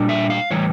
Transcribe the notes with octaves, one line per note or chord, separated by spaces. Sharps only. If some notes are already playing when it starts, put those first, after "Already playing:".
Already playing: A#2 G3 D4
E5
F5
A2 E3 G3 C#5